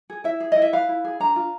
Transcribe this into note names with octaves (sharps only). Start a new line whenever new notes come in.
G#4
E4 E5
G#4
E4 D#5
E5
B4 F5
E4
G#4
D4 A#5
F4